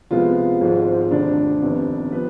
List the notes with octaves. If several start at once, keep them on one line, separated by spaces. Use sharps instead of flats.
C2 C3 F3 G#3 B3 F4
G#1 G#2 F3 G#3
F1 D#2 D3 D4
G1 F2 C3 D#3 B3
F3 B3 B4